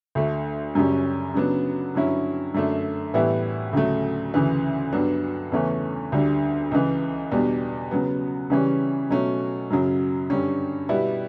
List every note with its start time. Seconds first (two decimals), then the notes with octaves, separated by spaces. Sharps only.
0.15 D2 D3 A3 D4
0.75 F#2 C#3 G3 C#4
1.34 C#3 F#3 B3 D4
1.95 G2 D3 F#3 C#4 E4
2.54 F#2 D3 A3 D4
3.14 A2 E3 G3 B3 E4
3.73 D2 C#3 F#3 A3
4.34 D2 C#3 E3
4.92 G2 F#3 B3 D4
5.52 E2 C#3 E3 A3 C#4
6.12 D2 D3 G3 D4
6.71 C#2 C#3 E3
7.31 E2 B2 G3 D4
7.91 C#3 F#3 B3
8.50 C#3 E3 G3 C#4
9.10 B2 F#3 A3 C#4
9.70 F#2 C#3 F#3
10.30 G2 D3 G3 C#4
10.89 B2 G3 B3 E4